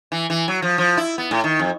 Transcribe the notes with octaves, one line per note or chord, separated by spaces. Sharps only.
E3
E3
F#3
F3
F3
E4
B3
A2
D#3
F2